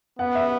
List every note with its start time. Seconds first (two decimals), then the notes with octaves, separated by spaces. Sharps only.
0.19 B3 F#5
0.35 E5